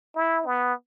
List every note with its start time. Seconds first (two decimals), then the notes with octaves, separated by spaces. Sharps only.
0.15 E4
0.46 B3